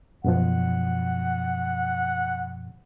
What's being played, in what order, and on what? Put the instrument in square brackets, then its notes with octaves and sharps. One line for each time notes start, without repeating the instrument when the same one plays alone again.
[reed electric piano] F#2 B2 F3 [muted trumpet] F#5